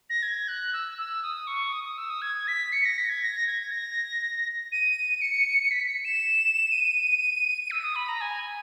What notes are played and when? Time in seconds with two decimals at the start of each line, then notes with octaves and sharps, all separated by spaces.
0.10 A#6
0.23 G#6
0.48 F#6
0.73 E6
0.98 E6
1.23 D#6
1.47 C#6
1.73 D#6
1.84 D#6
1.98 E6
2.10 D#6
2.22 G#6
2.48 B6
2.73 C#7
2.85 A#6
2.98 B6
3.09 G#6
3.23 A#6
3.47 G#6
3.71 A#6
4.72 D#7
5.21 C#7
5.71 B6
5.88 C#7
6.05 E7
6.72 D#7
7.71 E6
7.83 D#6
7.95 B5
8.08 A#5
8.21 G#5